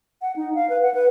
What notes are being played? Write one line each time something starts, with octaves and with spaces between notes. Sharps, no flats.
F#5
D#4
F5
B4
F#5
B4